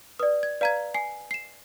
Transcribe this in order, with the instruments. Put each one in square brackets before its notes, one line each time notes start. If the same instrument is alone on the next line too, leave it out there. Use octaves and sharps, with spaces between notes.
[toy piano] B4 D5 [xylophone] D#6
[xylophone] G#6
[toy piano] B4 F5 [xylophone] D5 A#5 G#6
[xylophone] G#5 C7
C7 E7